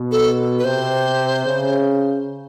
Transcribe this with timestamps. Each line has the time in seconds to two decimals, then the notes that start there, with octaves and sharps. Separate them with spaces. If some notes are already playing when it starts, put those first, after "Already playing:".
Already playing: B2
0.11 A4
0.59 B4
0.64 C3 C5
1.45 C#3